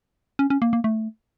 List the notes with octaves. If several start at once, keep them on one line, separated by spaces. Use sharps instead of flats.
C#4
C#4
A#3
A#3
A3